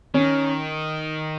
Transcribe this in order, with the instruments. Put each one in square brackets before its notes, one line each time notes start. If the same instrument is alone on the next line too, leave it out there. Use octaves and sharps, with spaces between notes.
[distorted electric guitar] D#3 [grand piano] C#4